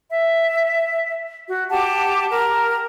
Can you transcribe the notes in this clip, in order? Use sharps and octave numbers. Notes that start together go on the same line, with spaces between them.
E5
F#4
G4 F#5 A5 D6
A#4